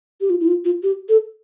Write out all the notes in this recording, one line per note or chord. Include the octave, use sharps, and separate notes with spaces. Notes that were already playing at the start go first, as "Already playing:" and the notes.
G4
F4
E4
F4
F4
G4
A4